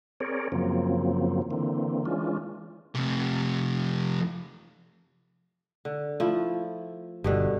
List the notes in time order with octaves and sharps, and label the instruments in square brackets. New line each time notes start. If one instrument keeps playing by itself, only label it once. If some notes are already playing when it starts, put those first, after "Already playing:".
[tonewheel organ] C4 G#4 A#4 C#5 D5
F#2 C#3 F3 F#3 A#3 C4
D3 E3 A#3 C4
E3 G#3 C#4 D4 F4
[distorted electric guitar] F2 C3
[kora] D3
F3 A3 E4
[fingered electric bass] G1 [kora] G2 B2 D3